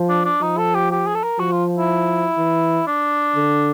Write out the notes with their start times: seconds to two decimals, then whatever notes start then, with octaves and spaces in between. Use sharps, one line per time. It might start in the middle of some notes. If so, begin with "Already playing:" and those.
Already playing: F3
0.09 D4
0.25 D4
0.42 F3 D#4
0.58 A4
0.75 G4
0.91 G4
1.07 G#4
1.15 A4
1.24 A#4
1.39 F3 F#4
1.52 F4
1.77 E4
2.38 E3
2.87 D4
3.36 D3